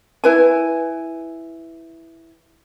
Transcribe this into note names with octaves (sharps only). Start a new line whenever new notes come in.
E4 B4 G#5